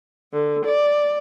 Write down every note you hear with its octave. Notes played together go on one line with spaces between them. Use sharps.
D3
D5